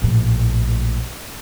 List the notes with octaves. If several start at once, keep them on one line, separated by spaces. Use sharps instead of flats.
A#1 A2